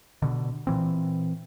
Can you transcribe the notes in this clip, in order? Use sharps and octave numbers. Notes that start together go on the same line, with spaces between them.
B2 D3
A#2 E3 C4